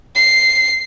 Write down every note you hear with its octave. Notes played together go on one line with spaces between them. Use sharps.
C7